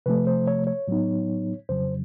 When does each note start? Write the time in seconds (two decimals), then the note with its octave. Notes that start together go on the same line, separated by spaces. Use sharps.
0.06 C3 F3 A3 B4
0.27 C5
0.47 C#5
0.67 C#5
0.88 A2 F#3 B3 D#4
1.69 F2 C#3 F#3 C5